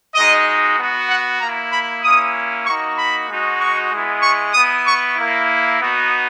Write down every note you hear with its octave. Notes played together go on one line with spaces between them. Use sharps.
G#3 D#4 F#4 D#5
B3 F#4
F#5
A#3 E4 A#5
B5
A#3 C#4 E4 D#6
A#3 D#4 F#4 C#6
B5
G#3 D#4 F#4
C#6
G#3 B3 E4
C#6
B3 E4 D#6
C#6
A#3 E4
B3 D#4 F#4